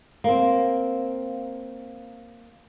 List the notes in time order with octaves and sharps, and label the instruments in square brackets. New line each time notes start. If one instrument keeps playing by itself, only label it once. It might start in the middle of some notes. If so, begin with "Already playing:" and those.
[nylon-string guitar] A#3 C4